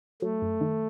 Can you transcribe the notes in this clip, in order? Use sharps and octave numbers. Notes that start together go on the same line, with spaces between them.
F#3 A3
F#2
D#3